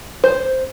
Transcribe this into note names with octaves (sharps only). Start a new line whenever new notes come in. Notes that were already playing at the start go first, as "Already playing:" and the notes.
C5